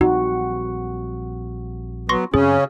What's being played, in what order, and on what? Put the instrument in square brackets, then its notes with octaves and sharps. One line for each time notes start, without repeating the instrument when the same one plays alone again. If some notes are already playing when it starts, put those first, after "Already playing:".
[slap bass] A#1 G3 C4 [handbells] D#4 [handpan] F#4
[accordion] F#3 B3 [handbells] C6 C#6 A#6
[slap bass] F#2 C4 [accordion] C#3 C#4 [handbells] G#4